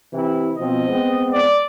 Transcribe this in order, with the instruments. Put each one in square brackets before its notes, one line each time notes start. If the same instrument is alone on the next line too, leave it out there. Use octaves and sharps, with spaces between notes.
[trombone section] C3 E3 E4
[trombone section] B2 F3 C4 [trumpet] D#5
[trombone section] G#3 B3 C4
[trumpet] D5